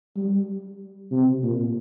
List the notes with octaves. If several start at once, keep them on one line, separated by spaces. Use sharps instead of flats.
G3
C3
A#2